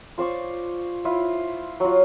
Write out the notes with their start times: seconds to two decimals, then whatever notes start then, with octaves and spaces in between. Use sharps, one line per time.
0.18 F4 C5 D5 C#6
1.05 E4 F4
1.80 F#3 F4